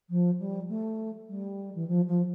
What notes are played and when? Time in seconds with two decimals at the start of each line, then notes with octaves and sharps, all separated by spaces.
0.10 F3
0.39 G3
0.69 A3
1.28 G3
1.75 E3
1.87 F3
2.07 F3